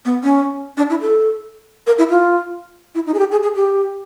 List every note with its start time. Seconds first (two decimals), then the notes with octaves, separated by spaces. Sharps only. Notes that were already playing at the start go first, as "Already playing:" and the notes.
0.05 B3
0.23 C#4
0.77 D4
0.90 E4
1.01 A4
1.87 A#4
1.98 E4
2.10 F4
2.95 E4
3.07 D#4
3.14 G#4
3.19 G4
3.31 G#4
3.43 G#4
3.56 G4